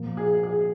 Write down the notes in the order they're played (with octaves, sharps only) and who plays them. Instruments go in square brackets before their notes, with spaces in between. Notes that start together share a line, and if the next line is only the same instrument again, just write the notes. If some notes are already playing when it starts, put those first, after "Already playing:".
Already playing: [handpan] A#2 F3 A#3
[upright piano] G#4
G#4